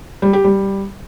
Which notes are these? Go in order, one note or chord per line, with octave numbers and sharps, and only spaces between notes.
G3
G4
G3